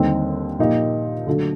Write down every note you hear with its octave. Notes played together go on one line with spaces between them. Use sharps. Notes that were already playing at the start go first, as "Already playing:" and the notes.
Already playing: D#2 D3 G3 C4 D#4
A#2 F3 A#3 D#4 G4
D3 F#3 A3 D4 F#4